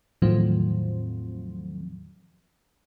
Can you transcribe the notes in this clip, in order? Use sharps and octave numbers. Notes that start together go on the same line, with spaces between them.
E2 A2 D#3 F3 F#3 C4